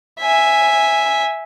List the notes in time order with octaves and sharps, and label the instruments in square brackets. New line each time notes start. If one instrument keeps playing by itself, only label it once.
[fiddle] E5 G#5